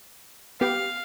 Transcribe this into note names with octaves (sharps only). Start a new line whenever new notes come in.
B3 G4 F5